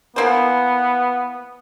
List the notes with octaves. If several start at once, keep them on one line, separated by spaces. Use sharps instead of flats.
E3 A#3 B3 C5